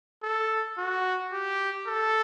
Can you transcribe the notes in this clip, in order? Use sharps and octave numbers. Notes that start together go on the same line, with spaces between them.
A4
F#4
G4
A4